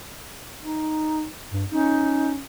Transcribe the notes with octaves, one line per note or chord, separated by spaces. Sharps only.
D#4
G2
C#4 D#4